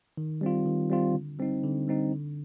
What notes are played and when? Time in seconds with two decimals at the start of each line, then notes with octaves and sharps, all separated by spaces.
0.17 D#3
0.41 G3 C4 F4
0.66 D#3
0.90 G3 C4 F4
1.14 D3
1.39 G3 C4 D#4
1.63 D3
1.88 G3 C4 D#4
2.12 D3